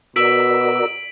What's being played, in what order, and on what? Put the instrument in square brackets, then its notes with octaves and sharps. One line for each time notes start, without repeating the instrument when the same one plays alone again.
[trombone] B2 [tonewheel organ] F#4 A#4 D5 [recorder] E6 [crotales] B6 D7 F#7